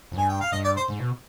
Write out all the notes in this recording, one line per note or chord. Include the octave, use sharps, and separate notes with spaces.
F2
G2 G#5
G5
F5
G2 D#5
D5
C5
G#2
B2